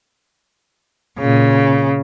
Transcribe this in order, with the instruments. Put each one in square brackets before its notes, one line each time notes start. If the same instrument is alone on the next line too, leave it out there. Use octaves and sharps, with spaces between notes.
[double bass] A#2 [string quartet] C#3